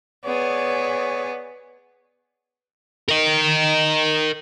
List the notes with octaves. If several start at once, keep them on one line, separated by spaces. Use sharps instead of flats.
B3 G#4 C#5 D5
A#4 D#5